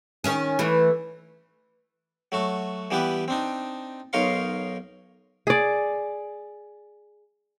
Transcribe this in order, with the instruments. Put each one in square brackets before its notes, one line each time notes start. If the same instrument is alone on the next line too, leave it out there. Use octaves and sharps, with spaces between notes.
[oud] D#3 C#4 G#4
E3 A3
[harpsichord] F#3 A3 F#4
E3 G3 B3 G4 B4
C4 D4 D#4
B1 D#4 A#4 C#5 F5 C6
[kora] G#4 D5